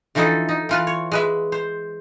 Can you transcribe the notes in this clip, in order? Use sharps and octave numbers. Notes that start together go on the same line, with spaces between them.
D3 E3 F3 D#4 E4 A4
D#4
E3 F4 B4
C#5
G#3 B4 E5
C5